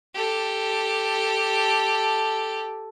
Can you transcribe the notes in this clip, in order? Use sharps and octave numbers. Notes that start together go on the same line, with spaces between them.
G4 A4